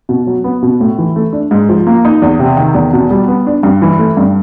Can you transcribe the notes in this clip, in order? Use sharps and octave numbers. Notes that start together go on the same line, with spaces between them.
B2
F#3
B3
B2
A2
E3
A3
D4
G#2
F3
A#3
D#4
E2
C3
D#3
E2
B2
G3
B3
D4
G2
E3
A3
G2